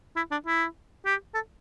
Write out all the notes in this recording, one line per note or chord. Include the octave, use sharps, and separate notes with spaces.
E4
D4
E4
G4
A4